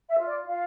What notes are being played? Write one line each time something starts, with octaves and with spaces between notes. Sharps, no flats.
E5
F4
D5
F4 F5